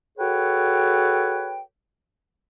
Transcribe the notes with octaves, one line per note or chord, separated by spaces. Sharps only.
F#4 G#4 A4 B4 C#5 G5